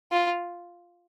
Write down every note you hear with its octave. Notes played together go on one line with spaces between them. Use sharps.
F4